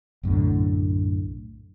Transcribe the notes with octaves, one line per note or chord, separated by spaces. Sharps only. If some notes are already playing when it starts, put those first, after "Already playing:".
B1 F#2 A2 D3